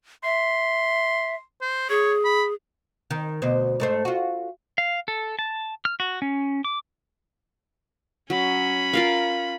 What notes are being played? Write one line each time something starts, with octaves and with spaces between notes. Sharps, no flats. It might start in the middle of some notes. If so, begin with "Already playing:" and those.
E5 C6
C5
G#4 C#5
B5
D#3
D2 B2 C5
G#2 A3 C5
F4 F#4
F5
A4
A5
F6
F#4
C#4
D6
F#3 C#4 B5
F4 A#4 F5